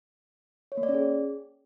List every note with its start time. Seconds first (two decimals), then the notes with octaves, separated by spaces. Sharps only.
0.72 C#5
0.77 A#3
0.83 D5
0.89 C#4
0.94 G#4